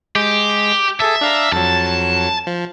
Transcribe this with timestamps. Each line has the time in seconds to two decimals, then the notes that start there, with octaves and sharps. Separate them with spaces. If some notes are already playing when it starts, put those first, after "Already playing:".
0.16 G#3 G4
1.00 G#4 A4 E5 A5
1.21 D4 F5 A#5
1.52 F2 F#3 A5
2.47 F3